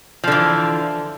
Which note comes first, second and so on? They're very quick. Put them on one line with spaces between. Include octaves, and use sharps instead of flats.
F3 D3 E3